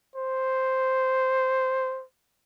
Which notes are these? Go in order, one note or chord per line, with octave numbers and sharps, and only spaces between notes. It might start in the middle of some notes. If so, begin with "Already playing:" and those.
C5